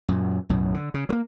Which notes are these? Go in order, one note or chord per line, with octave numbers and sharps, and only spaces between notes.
F#2 A#2
B1 F#2 A2
D3
C#3
F#3 A#3